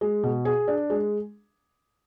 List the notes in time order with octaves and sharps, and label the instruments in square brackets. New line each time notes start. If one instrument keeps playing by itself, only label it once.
[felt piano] G#3
B2
G#4
D4
G#3